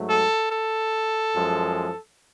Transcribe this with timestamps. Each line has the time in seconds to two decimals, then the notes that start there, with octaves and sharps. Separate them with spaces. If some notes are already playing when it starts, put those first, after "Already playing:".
Already playing: G#2 F#3 A3
0.09 A4
0.50 A4
1.33 F#2 F3 G#3